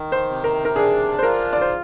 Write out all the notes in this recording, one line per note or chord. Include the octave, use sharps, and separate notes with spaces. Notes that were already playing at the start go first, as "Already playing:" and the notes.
Already playing: D#3
C5
C3
A#4
A#4
D4 G#4
C5
F4 A#4
D5
C5